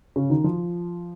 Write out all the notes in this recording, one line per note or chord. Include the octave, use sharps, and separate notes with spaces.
C#3 C#4
D#3 D#4
F3 F4